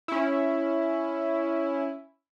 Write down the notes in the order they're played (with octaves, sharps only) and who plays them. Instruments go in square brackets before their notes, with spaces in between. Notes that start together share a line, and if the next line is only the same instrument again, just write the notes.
[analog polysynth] C#4 E4